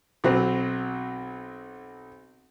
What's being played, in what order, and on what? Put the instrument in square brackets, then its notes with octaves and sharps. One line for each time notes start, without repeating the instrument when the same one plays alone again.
[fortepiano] B1 F#3 C4